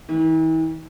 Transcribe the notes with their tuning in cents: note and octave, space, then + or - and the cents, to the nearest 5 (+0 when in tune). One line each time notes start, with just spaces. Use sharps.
E3 -45